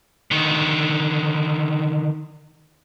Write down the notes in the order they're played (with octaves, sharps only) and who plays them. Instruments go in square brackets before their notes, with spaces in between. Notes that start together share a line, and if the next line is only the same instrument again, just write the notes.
[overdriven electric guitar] D3 D#3